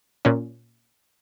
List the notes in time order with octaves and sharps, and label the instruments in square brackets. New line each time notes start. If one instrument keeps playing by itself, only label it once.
[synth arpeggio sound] A#2 C#4